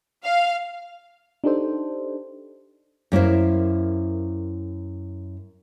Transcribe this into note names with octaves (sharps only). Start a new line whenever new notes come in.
F5
D4 D#4 G4 A4 C5
F#2 A#3 E4 C5